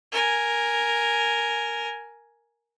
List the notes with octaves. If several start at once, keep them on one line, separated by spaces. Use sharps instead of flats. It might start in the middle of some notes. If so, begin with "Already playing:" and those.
A#4 G#5